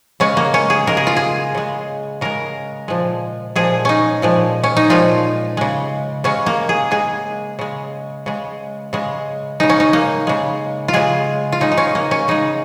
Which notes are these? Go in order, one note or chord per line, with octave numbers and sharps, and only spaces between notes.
C#3 G#3 C#4
A#3
C#4
G#4
C#3 G#3 A#4
G#4
F4
G#4
C#3 G#3
C#3 G#3 A#4
A#2 F3 G#3
A#2 F3 G#3 G#4
C#4 D#4
A#2 F3 G#3
C#4
D#4
A#2 F3 G#3 F4
C#3 G#3
C#3 G#3 C#4
A#3
G#4
C#3 G#3 G#4
C#3 G#3
C#3 G#3
C#3 G#3
C#3 G#3 D#4
C#4
D#4
A#3
C#3 G#3
F4
C#3 G#3 G#4
F4
C#3 G#3 D#4
D#4
C#4
A#3
C#4
C#3 G#3 D#4